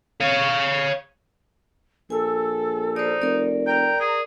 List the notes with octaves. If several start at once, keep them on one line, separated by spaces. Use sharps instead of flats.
C#5 F5
A#1 A4 G#5 E6
D#4 C5 D5
F1 A#4 D5
G5 A#5
G#4